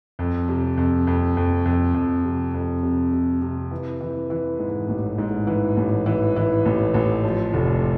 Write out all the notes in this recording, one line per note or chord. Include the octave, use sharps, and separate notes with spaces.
F2
C3
F2
F2
F2
F2
F2
C3
F2
C3
C3
C3
E3
E3
E3
G#2
A1
G#2
E3
A1
E3
E3
A1
A1
F3
F1